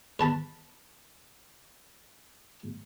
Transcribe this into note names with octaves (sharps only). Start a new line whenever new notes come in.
B4 A5 B5